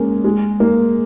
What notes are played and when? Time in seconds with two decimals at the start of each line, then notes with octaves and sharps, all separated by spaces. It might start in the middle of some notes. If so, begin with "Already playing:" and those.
Already playing: G#3 A#3 C#4
0.24 G#3
0.60 A#3